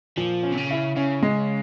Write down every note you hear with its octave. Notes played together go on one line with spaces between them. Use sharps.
A#2 F3
C#4
C3
C#3
E4
C#3 C#4
G#3